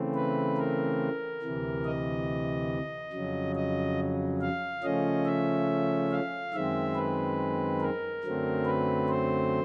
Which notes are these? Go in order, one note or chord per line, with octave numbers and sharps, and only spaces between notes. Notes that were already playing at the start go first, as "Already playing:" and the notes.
Already playing: C#3 E3 A3 C4
B4
A#4
D2 C3 E3
D#5
F2 C#3 F#3
D#5
F5
C#3 F3 A3 C#4 D#5
E5
F5
F#2 D#3 G#3 C4 E5
B4
A#4
F#2 D3 F#3 A3 C4
B4
C5